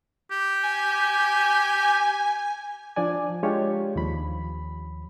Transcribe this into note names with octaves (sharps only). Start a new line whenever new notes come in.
G4
G#5
F3 D4 D5 G#5
G#3 D4 F4 G4 C#5
D#2 F3 B5